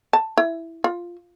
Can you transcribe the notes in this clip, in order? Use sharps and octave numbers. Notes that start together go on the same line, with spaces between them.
A5
E4
F4